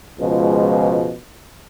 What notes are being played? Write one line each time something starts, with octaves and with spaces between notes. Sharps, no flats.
C#2 B2 F3 G#3